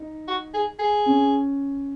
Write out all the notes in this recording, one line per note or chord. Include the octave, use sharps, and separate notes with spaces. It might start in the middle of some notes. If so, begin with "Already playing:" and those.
Already playing: D#4
F#4
G#4
G#4
C#4